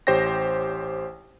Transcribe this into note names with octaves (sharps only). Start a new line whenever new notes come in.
A1 G4 C5 C#5 G5 A#6